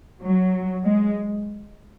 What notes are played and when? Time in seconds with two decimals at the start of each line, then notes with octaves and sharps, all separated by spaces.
0.22 F#3
0.88 G#3